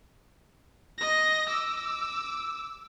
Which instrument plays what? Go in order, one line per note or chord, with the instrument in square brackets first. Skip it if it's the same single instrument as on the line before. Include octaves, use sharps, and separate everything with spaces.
[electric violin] D#5 A#6
D6 E6